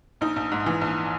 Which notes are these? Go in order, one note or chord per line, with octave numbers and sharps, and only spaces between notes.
A#1 D#4
A#1
G#2
E3
A#1